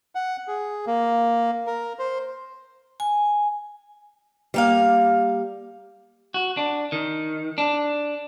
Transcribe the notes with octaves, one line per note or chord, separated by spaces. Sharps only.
F#5
G#4
A#3
A#4
C5
G#5
G3 A#3 F5
F#4
D4
D#3
D4